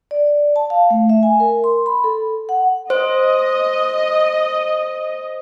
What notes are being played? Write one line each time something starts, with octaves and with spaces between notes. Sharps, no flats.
D5
A5
F5
A3
E5
G#5
A#4
C6
B5
A4
F#5
C5 D#5